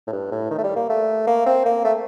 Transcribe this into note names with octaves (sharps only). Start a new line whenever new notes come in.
A2
G2
A2
D#3
A3
G3
A#3
A3
A#3
C4
A#3
A3